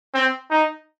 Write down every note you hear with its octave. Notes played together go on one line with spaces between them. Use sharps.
C4
D#4